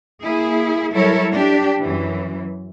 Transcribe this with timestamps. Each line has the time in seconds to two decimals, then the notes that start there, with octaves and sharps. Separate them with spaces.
0.23 A#3 E4 G#4
0.93 F#3 G3 E4 A4 A#4 C#5
1.33 D4 G4
1.80 F#2 E3